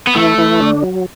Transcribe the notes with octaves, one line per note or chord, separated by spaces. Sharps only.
B3
E3 A3 E4
E3 E4
D3 D4
F#3